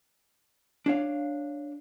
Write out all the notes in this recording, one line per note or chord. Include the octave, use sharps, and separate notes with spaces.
D4 C#5 F5